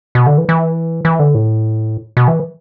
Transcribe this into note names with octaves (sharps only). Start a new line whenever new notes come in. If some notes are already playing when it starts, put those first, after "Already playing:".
B2
D3
E3
E3
E3
D3
A2
B2
E3